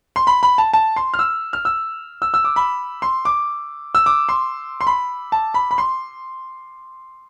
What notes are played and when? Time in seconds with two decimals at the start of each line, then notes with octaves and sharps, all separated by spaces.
0.16 C6
0.27 B5
0.43 B5
0.58 A5
0.73 A5
0.96 C6
1.14 F6
1.19 E6
1.53 F6
1.65 E6
2.22 E6
2.34 E6
2.44 D6
2.56 B5
3.02 C6
3.25 D6
3.95 E6
4.06 D6
4.29 C6
4.81 C6
4.87 B5
5.32 A5
5.54 B5
5.71 B5
5.78 C6